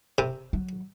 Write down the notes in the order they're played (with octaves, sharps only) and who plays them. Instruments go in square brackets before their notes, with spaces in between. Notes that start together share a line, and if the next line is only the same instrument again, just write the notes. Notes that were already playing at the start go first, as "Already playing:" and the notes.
[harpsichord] C3
[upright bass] F#3